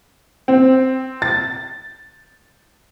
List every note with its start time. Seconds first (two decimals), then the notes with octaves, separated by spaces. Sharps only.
0.48 C4
1.22 A6